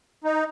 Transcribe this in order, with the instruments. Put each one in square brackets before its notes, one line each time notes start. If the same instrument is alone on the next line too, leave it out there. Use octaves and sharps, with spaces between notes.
[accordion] D#4